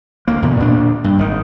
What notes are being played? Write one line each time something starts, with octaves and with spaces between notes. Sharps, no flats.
D2 A#3
E2 B2 D3
D2 A#2 D4
G2
G#1 D#3